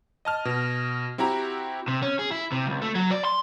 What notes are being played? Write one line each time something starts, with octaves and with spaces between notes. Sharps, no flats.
D#5 A5 F6
B2
C4 E4 F#4 G4 A#5 B5
C3
C#4
G#4
E4
C3
C#2
A3
F#3
D5
C6